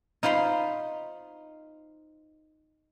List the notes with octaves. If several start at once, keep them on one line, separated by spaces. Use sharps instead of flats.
D#4 F4 C5 B5 C6